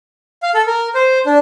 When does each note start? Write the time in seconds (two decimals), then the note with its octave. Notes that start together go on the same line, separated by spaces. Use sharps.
0.43 F5
0.54 A4
0.67 A#4
0.95 C5
1.26 D4